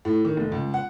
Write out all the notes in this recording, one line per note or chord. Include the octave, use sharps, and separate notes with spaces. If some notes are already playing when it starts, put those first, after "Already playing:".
A2
D#3
F1
C#2
F#5